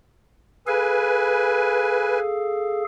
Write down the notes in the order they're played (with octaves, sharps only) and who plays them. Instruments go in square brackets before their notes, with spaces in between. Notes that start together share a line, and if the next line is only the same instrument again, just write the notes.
[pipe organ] G#4 A4 F5 [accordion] B4 G#5